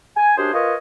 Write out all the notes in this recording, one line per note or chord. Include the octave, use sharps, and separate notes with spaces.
G#5
F#2 D4 G4 G#4 C5
F4 A#4 B4 C#5 D#5